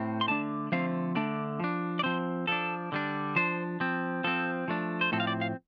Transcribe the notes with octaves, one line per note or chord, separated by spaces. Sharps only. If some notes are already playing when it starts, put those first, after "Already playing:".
Already playing: A2 A3 C4
C6
D3 A3 D4 A5
D3 F3 A3 C4 F5
D3 A3 D4 D5
F3 D4
D5
F3 C4 C5
F3 D4 A4
D3 G3 D4
F3 D4 C5
F3 C4
F3 C4 A4
F3 A3 D4
C5
A2 F3 C4 A4
F5
D5
F5